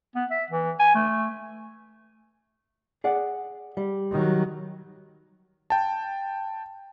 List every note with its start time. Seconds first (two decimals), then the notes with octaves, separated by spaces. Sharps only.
0.15 B3
0.31 E5
0.50 E3
0.79 G#5
0.95 A3
3.04 G#4 D5 F#5
3.77 G3
4.11 D#3 F#3
5.70 G5 A5